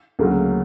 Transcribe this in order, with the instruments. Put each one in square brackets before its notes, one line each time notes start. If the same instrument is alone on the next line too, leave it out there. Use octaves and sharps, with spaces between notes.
[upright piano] D2 C#3 F#3 A#3